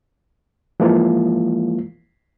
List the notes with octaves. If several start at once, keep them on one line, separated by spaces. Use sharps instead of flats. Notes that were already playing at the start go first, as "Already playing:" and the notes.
E3 F3 G#3 A#3 E4 F4